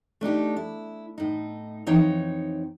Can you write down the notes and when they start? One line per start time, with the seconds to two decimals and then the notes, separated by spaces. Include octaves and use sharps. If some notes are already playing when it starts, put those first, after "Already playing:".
0.21 A3 D4 D#4 G4
0.56 E4
1.18 A2 D#4
1.87 F2 E3 D#4 C#5 G5